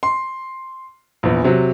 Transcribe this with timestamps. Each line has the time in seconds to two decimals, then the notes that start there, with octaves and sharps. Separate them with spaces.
0.03 C6
1.23 A#1 E2
1.44 C3 F#3